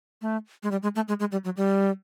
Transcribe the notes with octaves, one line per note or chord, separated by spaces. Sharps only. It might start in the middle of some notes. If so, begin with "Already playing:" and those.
A3
G#3
G3
G#3
A3
G#3
G#3
G3
F#3
G3